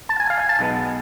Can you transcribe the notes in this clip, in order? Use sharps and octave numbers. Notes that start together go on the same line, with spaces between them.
A5
G#5
F5
G#5
A5
B1 B2 G#3 B3